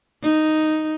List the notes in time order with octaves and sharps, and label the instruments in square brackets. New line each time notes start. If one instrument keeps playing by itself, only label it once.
[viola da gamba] D#4